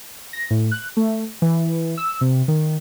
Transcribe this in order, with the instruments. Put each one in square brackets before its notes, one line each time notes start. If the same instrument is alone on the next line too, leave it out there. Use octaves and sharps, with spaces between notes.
[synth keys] A#6
A2
F#6
A3
E3
E6
C3
D#3